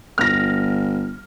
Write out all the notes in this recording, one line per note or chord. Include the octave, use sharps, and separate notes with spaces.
G1 F6 A#6